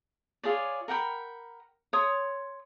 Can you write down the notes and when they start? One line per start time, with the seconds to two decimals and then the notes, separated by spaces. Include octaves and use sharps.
0.44 F4 G#4 C#5 D5
0.88 A#4 F#5 G5 B5
1.93 C#5 C6 D#6